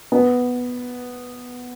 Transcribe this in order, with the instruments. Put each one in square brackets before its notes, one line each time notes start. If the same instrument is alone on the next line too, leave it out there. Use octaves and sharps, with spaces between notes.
[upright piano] B3